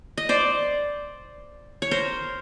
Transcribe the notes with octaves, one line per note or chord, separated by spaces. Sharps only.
D#5
C5 D5
C#5
A#4 C5